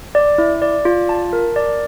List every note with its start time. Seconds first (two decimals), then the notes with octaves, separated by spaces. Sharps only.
0.15 D5
0.38 E4
0.62 D5
0.85 F4
1.09 A5
1.33 A#4
1.56 D5